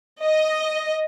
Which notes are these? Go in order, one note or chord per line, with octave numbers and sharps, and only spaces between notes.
D#5